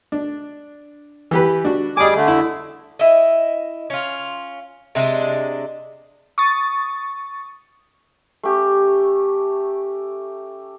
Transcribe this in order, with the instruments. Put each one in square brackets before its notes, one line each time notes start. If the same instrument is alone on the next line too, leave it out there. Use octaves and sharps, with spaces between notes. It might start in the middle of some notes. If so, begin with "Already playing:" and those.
[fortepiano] D4
E3 G4 B4
D4 F#4
[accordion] G3 G#4 D6 [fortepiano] D#5 G#5
[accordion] D3 A3
[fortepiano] E4
[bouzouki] E4 D#5
C#4 F4
C3 G#3 D4 D#5
[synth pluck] C#6 D#6 A6
[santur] A3 C#4 G4